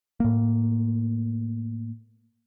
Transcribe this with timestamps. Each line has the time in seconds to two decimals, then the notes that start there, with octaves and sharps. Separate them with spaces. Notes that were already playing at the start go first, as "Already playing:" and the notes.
0.20 A2 A#3